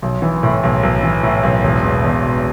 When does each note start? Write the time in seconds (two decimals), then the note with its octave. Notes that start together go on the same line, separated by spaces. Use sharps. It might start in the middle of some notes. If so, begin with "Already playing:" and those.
0.02 B1
0.22 E3
0.43 A2
0.63 B1
0.83 B1
1.03 E3
1.23 A2
1.43 B1
1.64 E1
1.84 B2
2.04 E2
2.24 E1